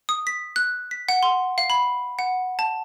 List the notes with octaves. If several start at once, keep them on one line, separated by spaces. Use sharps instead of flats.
D#6
B6
F#6
B6
F#5
C6
F5
B5
F#5
A5